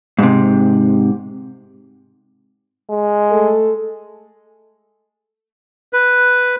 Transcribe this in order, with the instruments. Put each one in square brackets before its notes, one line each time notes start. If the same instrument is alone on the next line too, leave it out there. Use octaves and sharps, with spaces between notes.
[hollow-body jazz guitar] G#2 C3
[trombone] G#3
[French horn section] A3 A4
[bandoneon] B4